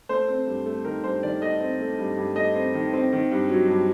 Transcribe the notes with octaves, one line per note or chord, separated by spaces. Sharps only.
A3 C5
C4
G2
A3
D#3 A#4
G2 C5
D#3 D5
A3 D#5
C4
A3
G2
G2
A3 D#5
C4
D#3
C4
D#3
G2
F#3
G2